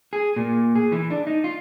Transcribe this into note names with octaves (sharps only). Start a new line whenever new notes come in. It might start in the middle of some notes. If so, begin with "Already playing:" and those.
G#4
A#2
G#4
E3
D4
D#4
F4